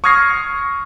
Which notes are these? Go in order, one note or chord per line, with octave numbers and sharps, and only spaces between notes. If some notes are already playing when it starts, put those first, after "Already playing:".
C#6 D#6 F6 G#6 A#6 C7